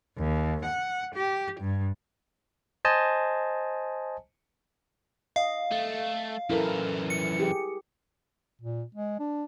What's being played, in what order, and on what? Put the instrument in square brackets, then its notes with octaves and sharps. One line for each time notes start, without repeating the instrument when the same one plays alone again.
[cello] D#2
F#5
G4
G2
[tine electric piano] C5 D#5 G#5 A5
[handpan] D#5 [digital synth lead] F5
[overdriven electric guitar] A3
[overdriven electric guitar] F#2 E3 [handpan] E4 A4 A#4
[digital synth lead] C#7
[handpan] G4 G#4
[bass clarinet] A#2
G#3
D4